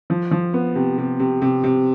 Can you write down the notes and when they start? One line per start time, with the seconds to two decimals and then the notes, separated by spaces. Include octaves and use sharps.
0.10 F3
0.31 F3
0.54 B3
0.75 C3
0.98 C3
1.20 C3
1.42 C3
1.64 C3